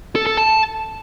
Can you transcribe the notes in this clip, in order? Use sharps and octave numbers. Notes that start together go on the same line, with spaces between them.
A4
A4
A5